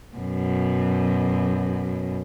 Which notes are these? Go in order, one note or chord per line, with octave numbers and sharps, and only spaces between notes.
F#2 B2